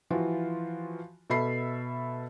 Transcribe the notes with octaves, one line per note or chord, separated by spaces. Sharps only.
E3 F3 F4 F#4
B2 A4 E5 B5 C7